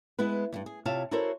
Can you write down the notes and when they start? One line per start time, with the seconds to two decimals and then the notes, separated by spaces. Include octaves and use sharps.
0.19 G#3 B3 E4 B4
0.52 E2 G2
0.66 G#4
0.85 C3 E4 F4 C#5 F5 A5
1.11 E4 F#4 A4 A#4 C5 C#5